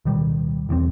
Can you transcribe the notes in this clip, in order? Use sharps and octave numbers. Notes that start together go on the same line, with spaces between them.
D1 B2 D#3 G3
E1 E2 C#3 C4